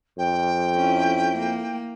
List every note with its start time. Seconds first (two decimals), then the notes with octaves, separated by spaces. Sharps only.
0.18 F2 G5
0.76 C#4 E4
1.37 A#3